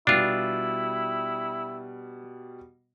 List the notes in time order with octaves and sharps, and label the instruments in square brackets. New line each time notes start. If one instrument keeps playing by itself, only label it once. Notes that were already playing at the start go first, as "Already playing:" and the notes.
[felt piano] B2 G3 [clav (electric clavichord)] D4 F4 [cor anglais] E4